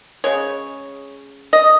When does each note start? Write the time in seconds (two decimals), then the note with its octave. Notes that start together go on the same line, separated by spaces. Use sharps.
0.24 C#3 G#3 C#5
1.53 D#5